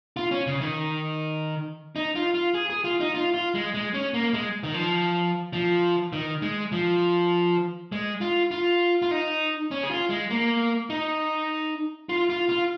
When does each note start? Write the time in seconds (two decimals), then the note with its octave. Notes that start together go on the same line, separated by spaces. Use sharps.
0.17 F4
0.31 C#4
0.47 C#3
0.61 D#3
1.96 D#4
2.15 F4
2.34 F4
2.54 G#4
2.70 G#4
2.84 F4
3.00 D#4
3.14 F4
3.34 F4
3.55 G#3
3.74 G#3
3.94 C#4
4.14 A#3
4.34 G#3
4.63 D#3
4.74 F3
5.53 F3
6.13 D#3
6.42 G#3
6.72 F3
7.92 G#3
8.21 F4
8.51 F4
9.02 F4
9.11 D#4
9.71 C#4
9.83 G#4
9.91 F4
10.10 G#3
10.30 A#3
10.90 D#4
12.09 F4
12.30 F4
12.49 F4